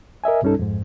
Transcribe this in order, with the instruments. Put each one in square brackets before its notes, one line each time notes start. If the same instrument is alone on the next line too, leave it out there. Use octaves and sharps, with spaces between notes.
[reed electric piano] A#4 D#5 E5 G#5
C2 G2 G3 C#4 D#4 A4
F2 G#2